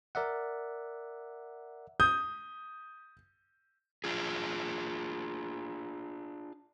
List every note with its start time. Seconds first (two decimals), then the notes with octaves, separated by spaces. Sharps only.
0.15 A#4 D5 E5 F#5
2.00 D#6 G6
4.04 D4 F4 G#4